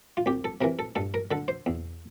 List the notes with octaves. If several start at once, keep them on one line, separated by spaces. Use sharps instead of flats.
F4
C2 G4
A4
C3 E3 A#4
A4
G2 A4
A#4
D3 A4
C5
E2